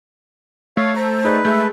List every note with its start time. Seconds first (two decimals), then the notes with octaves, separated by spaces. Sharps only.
0.77 A3 C#5 F5
0.96 C5 A#5
1.24 D#4 G#4 B4 D5
1.45 G#3 A3 E5 G6